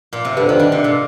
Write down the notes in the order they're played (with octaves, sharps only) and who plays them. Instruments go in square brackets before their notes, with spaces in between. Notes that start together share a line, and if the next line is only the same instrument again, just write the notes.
[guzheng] A#2
C3
[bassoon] G2 [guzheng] D3
[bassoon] F2 [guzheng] D#3
[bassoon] G2
[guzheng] D3
C3
A#2